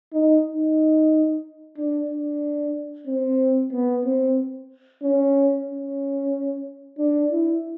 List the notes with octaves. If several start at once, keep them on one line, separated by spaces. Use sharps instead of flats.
D#4
D#4
D4
D4
C4
B3
C4
C#4
C#4
D4
E4